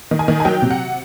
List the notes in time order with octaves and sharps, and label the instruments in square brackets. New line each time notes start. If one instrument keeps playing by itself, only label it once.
[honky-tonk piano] D#3
G#5
D#3
G#5
F#3 G5
C3
F#5